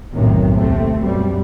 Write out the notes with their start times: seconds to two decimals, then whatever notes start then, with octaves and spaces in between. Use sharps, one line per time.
0.14 B1 F#2 A2 C3 D#3 F#3
0.54 D#2 C3 A3 C4
1.02 F#2 B2 G3